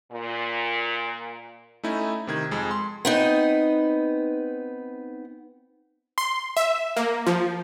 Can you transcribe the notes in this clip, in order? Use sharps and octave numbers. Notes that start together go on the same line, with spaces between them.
A#2
A3 C#4 D#4 E4
C3 D#3 G#6
F2 G#3
C6
B3 C4 D#4
C6
E5
A#3
F3